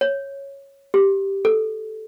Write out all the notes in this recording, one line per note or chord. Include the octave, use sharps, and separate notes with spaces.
C#5
G4
A4